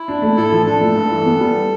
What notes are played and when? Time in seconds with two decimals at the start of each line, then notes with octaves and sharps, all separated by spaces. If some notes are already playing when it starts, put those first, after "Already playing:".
Already playing: E4
0.08 D4
0.22 A3
0.37 A2 A4
0.52 F3
0.66 D4 A4
0.81 A3
0.96 G2
1.11 E3
1.26 B3
1.40 G3